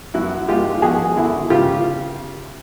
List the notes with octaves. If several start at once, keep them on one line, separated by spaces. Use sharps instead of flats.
F#2 E4 F#4
G#3 F4 G4
F3 F#4 G#4
D3 E4 F#4
C#3 F4 G4